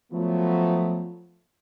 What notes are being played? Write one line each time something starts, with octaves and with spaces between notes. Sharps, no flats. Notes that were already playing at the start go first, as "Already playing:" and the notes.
F3 F#3 A3 B3